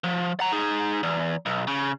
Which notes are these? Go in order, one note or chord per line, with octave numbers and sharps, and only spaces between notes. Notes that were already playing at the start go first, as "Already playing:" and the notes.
F3
F#5 A#5
D#4 G#4
E2
B1
C#3